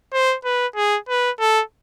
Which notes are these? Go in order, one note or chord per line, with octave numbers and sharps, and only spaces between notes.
C5
B4
G#4
B4
A4